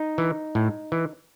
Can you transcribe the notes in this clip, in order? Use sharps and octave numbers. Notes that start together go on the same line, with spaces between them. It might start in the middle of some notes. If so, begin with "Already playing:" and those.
Already playing: D#4
E3
A2
E3